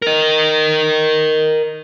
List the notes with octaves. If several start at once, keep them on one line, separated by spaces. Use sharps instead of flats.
A#4 D#5